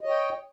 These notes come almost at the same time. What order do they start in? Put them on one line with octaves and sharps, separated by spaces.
D#5 C#5 G5